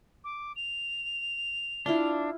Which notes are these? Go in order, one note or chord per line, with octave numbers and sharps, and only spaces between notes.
D6
F7
D4 E4 F4 C6